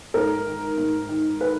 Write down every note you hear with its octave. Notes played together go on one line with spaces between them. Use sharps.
G#2 A#4
D#3
G#2
D#3
D#3 B4